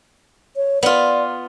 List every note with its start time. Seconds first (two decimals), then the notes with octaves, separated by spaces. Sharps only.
0.56 C#5
0.83 B3 F4 D5